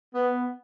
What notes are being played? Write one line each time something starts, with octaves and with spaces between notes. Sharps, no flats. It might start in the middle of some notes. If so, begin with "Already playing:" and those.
B3